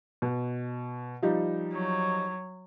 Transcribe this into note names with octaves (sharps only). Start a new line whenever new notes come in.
B2
F3 G3 D#4
F#3